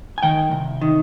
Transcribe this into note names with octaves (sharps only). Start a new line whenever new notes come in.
G#5
D#3 G5
C2
D#3